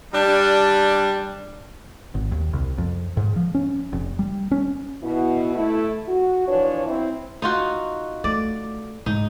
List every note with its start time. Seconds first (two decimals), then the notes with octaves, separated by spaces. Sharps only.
0.13 G3 D4
2.15 G#1
2.32 D#2
2.53 C2
2.78 F2
3.17 G#2
3.36 F3
3.55 C#4
3.93 F1
4.19 G3
4.51 C#4
5.03 B2 E4
5.55 A3 E4
6.08 F#4
6.48 E3 F3 D4 C#5
6.86 C4 E4
7.42 D#4 F4 F#4
8.24 A3 D5
9.06 G#2 D#4